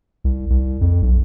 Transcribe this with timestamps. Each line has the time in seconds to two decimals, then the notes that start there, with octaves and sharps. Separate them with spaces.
0.24 C2
0.50 C2
0.81 F2
1.02 B1